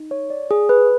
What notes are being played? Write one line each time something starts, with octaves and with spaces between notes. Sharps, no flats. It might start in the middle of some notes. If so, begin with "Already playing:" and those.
Already playing: D#4
C#5
D5
G#4
B4